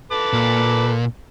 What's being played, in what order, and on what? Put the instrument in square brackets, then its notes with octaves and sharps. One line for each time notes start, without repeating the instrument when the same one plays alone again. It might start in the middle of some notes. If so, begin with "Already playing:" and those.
[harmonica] A4 B4 D6
[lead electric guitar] A#2